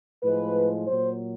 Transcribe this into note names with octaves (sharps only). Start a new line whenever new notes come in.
A2 F3 G#3 B4
A#2 F#3 C5